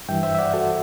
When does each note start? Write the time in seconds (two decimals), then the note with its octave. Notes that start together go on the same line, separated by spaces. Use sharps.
0.09 G2 E3 E5 G5
0.23 C5 E5
0.35 E5
0.38 D5 F#5
0.54 F#4 A4